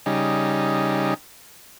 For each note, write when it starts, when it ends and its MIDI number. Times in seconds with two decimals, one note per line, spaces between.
0.06 1.14 49
0.06 1.14 55
0.06 1.14 63